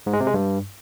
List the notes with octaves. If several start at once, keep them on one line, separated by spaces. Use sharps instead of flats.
G#2
G#3
C3
G#3
G2